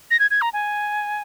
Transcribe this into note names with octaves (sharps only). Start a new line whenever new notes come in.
A#6
G#6
G#6
A#5
G#5